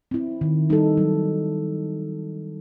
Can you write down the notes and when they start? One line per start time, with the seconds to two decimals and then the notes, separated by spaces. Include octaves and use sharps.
0.11 C4 E4
0.41 D#3
0.70 G3 D#4 A4
0.97 F#3